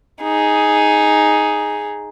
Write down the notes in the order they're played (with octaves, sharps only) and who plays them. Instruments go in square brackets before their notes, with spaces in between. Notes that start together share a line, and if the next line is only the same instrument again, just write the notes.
[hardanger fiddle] D#4 G#4